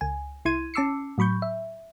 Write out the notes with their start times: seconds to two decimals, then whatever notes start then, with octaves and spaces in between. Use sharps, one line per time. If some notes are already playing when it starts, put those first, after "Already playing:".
0.01 C#2 G#5
0.45 C2 E4 C6 G#6 D#7
0.74 C#4 A5 D6 E6 C7 C#7
1.18 A2 F#3 B5 C#6 G6
1.42 E5